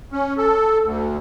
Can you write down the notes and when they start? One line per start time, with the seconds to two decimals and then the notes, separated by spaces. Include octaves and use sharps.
0.12 C#4
0.37 A4
0.83 D2